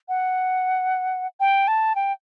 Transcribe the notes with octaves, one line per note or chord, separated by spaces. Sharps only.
F#5
G5
A5
G5